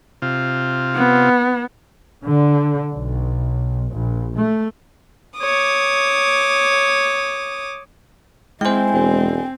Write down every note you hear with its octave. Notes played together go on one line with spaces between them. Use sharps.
C3 F4
B3
D3
B1
A#1
A3
C#5 D6 D#6
G#3 C4 E4 C5 G5 G#5
E1 C4